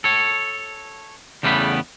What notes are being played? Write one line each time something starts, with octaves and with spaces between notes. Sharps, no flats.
A4 C#5
E2 C#3 G3 A3 B3 B5